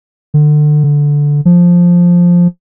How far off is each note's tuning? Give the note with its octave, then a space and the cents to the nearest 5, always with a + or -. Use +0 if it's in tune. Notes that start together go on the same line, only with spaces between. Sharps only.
D3 +30
D3 -10
F3 +5